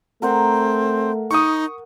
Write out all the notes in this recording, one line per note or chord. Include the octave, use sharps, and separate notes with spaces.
A3 C4 A#4 F#5
D#4 C#6 D#6